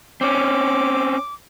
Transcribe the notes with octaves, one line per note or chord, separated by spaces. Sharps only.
C4 C#4 D6